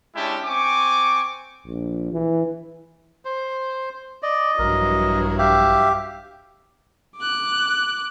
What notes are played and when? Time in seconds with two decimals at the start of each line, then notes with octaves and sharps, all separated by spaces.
0.15 G#3 C#4 D4 E4 G4 A5
0.44 C4 G#5 C#6 D6
1.66 A#1
2.13 E3
3.25 C5
4.23 D5 D#5
4.59 A#1 G2 E3 F#3 A#4
5.38 G4 E5 F5
7.17 D6 F#6